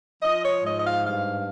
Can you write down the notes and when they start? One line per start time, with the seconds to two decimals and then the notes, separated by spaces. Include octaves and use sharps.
0.23 F3 D#5
0.43 C#5
0.63 G#2 D#5
0.78 D#5
0.84 F5
1.04 G2 F5